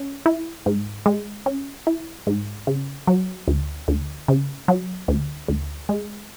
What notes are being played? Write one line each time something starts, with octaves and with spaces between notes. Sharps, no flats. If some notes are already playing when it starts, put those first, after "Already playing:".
Already playing: C#4
E4
G#2
G#3
C#4
E4
G#2
C#3
F#3
D2
D2
C#3
F#3
D2
D2
G#3